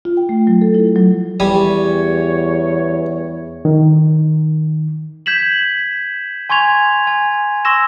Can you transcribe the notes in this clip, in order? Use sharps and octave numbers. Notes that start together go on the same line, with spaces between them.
F4
G5
A3
F#3
A4
E4
F#3
E2 G3 C#5 G#5
D#3
G6 G#6 B6 E7 F#7
G#5 C6 C#6 G#6 F7
G#5
C6 C#6 E6 A#6 E7